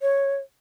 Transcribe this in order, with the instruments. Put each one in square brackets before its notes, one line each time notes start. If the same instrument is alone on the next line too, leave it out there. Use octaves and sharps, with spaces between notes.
[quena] C#5